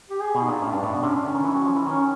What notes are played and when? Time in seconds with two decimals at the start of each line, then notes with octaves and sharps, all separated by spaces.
0.10 G4
0.21 G#4
0.35 B2
0.42 D#4
0.49 A#2 D4
0.61 A2 C#4
0.70 G2 D4
0.83 A2
0.94 B2
1.03 C3 C#4
1.15 D4
1.25 D3 C#4
1.34 D#3
1.44 E3
1.55 F#3
1.66 F3
1.76 E3
1.85 D#3 C#4